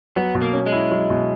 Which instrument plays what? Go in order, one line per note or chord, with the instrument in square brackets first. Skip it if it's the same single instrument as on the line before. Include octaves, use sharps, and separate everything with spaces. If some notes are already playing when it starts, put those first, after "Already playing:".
[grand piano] F#3 [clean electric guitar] B3
[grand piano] B2
[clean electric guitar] A#3
[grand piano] C#4
[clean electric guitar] G#3
[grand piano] E4
F#3
B2